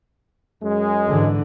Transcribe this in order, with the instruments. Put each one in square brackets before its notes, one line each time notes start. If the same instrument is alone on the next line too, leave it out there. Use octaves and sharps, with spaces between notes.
[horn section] F#2 G#3
[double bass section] G#2 D3 E3